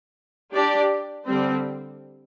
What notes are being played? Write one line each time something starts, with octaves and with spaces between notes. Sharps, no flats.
D4 G4 D5
D3 G3 C4